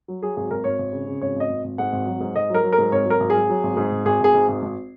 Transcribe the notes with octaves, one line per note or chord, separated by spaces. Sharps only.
F#3
F#3 G#4
G#1 G#4
G#1 A#4
G#1 C#5
G#1
C#3
C#3
G#1 C#5
G#1 D#5
G#1
G#1
G#2 F#5
G#1
F#3
G#2
G#2 D#5
F#3
A#4
F#3
A#4
G#2
G#1 C#5
F#3 A#4
G#1
F#3 G#4
F#3
G#1
G#2
G#1
G#1 G#4
G#1 G#4
G#2
G#1
G#1